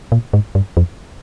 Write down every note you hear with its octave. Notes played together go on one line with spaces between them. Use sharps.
A#2
G#2
G2
F2